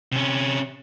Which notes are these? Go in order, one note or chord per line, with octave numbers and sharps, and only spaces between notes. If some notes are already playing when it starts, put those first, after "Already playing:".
C3 C#4